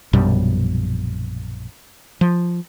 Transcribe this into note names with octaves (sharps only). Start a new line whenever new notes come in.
A#1 F#2 B2 G3
F3